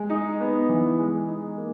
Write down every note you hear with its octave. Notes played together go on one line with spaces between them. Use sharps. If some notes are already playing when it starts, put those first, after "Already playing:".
Already playing: G#3
D#4
B3
E3
G#3
D#4
A#3